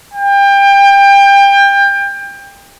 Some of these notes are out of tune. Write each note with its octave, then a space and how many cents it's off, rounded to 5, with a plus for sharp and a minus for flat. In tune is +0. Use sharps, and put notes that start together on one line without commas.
G5 +25